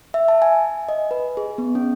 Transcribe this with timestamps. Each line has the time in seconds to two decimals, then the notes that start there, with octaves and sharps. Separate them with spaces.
0.14 E5
0.28 A5
0.42 G#5
0.89 D#5
1.11 B4
1.37 G#4
1.58 B3
1.75 C#4